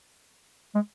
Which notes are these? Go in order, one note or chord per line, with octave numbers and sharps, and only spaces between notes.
G#3